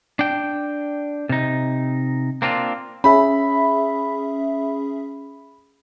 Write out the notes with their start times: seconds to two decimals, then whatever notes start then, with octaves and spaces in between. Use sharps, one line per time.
0.19 D4 G5
1.29 C3 D#4
2.42 A#3 C4 D4 F4
3.04 C#4 G#4 E5 B5